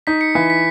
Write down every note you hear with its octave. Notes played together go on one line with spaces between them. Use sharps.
D#4 B6
C#7
E3 B6
B6